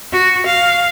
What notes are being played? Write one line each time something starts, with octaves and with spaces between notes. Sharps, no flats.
F#4
F5